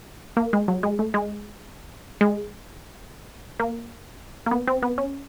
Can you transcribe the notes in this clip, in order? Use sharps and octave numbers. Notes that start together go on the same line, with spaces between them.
A#3
G#3
F#3
G#3
A3
G#3
G#3
A#3
A#3
B3
C4
B3
C#4